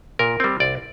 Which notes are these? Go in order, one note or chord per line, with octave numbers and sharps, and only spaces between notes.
A#2 A#4
G3 C4
C2 D5